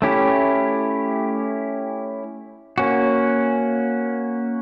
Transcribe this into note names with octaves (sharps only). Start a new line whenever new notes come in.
A3 C#4 E4 G4
A#3 C#4 F#4